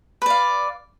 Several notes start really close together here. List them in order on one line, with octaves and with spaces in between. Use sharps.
B4 D5 F5